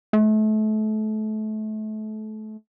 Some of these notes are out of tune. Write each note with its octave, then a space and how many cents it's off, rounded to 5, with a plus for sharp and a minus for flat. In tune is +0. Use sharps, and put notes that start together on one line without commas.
A3 -30